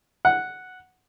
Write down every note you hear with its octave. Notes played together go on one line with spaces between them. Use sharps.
F#5